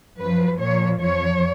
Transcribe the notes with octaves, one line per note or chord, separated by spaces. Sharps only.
F#2 F3 B4
A#2 F3 C#5
F2 F3 C#5